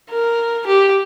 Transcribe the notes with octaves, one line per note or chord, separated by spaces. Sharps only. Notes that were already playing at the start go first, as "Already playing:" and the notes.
A#4
G4